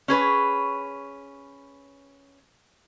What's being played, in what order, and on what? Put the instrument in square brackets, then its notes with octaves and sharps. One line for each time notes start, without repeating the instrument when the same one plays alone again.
[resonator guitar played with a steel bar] C#4 G#4 B4